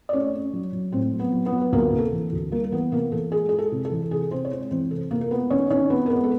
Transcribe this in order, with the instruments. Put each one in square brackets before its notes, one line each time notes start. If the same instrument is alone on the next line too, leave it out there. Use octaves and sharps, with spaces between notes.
[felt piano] D5
A3 C#4 C#5
C#4
F#3
F#3
A2 C4 C5
F#3
B3 B4
F#3
B3 B4
F#3
B4
D2 A#3 A#4
C3
A4
E3
D2
G3 A#3 A#4
A#4
E3 B3 B4
C3 A#3 A#4
E3 A4
G#3 G#4
G#3 G#4
A4
C3
A4
E3
C3 G#4
C3 C4 C5
C#5
G#3 C4 C5
E3 C4 C5
C3 A4
C3 A#3 A#4
A#4
G#3 B3 B4
D#3 C#4 C#5
D#3 C#4 C#5
B3 C4 B4
A#4
G#3 B3 B4
A4